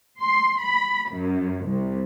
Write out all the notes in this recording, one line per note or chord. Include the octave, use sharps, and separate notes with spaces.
C6
B5
F#2
C2